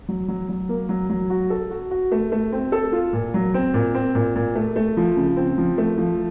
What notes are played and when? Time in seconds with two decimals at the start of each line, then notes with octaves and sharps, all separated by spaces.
0.08 F#3
0.28 F#3
0.49 F#3
0.69 A#3
0.89 F#3
1.10 F#3
1.30 F#4
1.50 A4
1.71 F#4
1.91 F#4
2.12 A3
2.32 A3
2.52 C4
2.72 A4
2.93 F4
3.13 A#2
3.34 F#3
3.54 C4
3.74 A#2
3.95 C4
4.15 A#2
4.36 A#2
4.55 A3
4.76 A3
4.97 F3
5.17 C#3
5.37 C4
5.58 F3
5.78 A3
5.98 F3